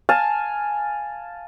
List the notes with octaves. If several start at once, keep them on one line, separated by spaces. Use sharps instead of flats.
F5 G#5 A5